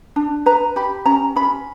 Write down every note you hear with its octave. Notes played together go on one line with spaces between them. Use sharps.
D4
B4 A#5
G4 B5
C#4 A#5
C#4 B5